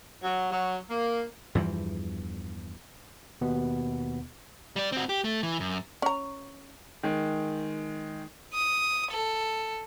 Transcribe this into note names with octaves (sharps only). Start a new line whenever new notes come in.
F#3
F#3
A#3
E2 G2 E3 F3
D#2 B2 B3
G3 D5
C4 F#4
G4
A3
E3
F#2
C#4 A#5
D#3 G#3
D#6
A4